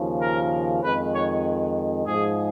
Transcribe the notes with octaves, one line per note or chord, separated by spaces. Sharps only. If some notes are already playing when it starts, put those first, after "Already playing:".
Already playing: D#2 C#3 F3
A#4
F2 D#3 G#3 B4
C#5
G#2 F3 G#3 G#4